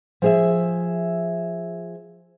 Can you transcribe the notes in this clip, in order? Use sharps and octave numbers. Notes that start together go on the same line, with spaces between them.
F3 G#4 E5